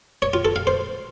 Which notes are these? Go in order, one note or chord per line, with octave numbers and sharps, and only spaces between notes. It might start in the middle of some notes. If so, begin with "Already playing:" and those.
C#5
F4
A4
F5
C5